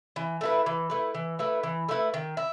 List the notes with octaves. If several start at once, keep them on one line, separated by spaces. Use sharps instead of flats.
E3
A3 E4 B4
E3
A3 E4 B4
E3
A3 E4 B4
E3
A3 E4 B4
D#3
E4